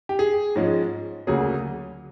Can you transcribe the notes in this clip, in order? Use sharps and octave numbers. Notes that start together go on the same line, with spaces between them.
G4
G#4
G#2 F3 G#3 C#4
D2 C#3 F#3 A#3 C#4 G#4